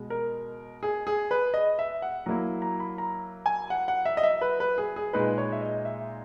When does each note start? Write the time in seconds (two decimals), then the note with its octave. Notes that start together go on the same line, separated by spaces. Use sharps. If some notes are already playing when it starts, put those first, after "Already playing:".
Already playing: B2 G#3
0.10 A#4
0.83 G#4
1.07 G#4
1.31 B4
1.54 D#5
1.79 E5
2.02 F#5
2.26 F#3 A#3 E4 A#5
2.62 A#5
2.80 B5
2.98 A#5
3.46 G#5
3.70 F#5
3.88 F#5
4.05 E5
4.17 D#5
4.23 E5
4.41 B4
4.60 B4
4.78 G#4
4.96 G#4
5.13 A#2 G#3 D#4 B4
5.38 C#5
5.52 E5
5.62 D#5
5.85 E5